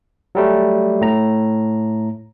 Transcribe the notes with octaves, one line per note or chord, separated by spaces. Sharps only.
F#3 G3 A3
A2 A#5